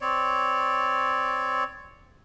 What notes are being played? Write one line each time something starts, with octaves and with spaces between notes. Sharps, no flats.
C4 C#5 D5